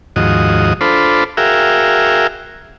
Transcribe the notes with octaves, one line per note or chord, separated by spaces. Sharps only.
D#2 G#2 F3 F#4 D#5
D4 F4 A4 C5 B5
F#4 G#4 A#4 E5 F5 G5